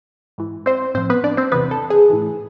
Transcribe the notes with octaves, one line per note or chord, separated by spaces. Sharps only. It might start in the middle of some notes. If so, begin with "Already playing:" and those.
G#2 E3
C4 C5
A2 F3 C4 C5
B3 B4
D4 D5
C4 C5
E2 C3 E3 B3 B4
A4
G#4
A2 E3